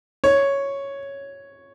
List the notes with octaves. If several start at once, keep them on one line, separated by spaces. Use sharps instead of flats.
C#5